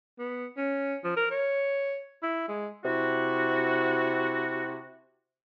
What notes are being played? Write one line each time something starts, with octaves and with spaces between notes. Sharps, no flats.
B3
C#4
F3
A#4
C#5
E4
G#3
C3 E4 F#4